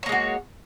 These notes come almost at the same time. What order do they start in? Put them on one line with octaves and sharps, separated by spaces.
C#5 A#3 G#3 F#4